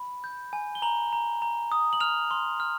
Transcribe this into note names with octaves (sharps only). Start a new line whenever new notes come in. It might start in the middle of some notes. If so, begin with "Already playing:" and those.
Already playing: B5
G6
G#5
G7
A#5 F#7
A#5
A#5
D#6
F#7
F6 F7
C6
F6